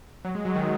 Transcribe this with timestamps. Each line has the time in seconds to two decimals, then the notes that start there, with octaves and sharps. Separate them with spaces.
0.25 F#3
0.35 G#3
0.45 F#3
0.56 D#3